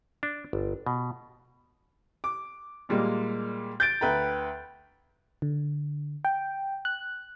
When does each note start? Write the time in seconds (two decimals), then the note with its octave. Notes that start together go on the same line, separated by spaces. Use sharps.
0.23 D4
0.53 G1
0.87 B2
2.24 D6
2.89 A#2 G3 G#3 A#3
3.80 G6 A6 D7
4.01 D2 B4 G5 A#5
5.42 D3
6.25 G5
6.85 F#6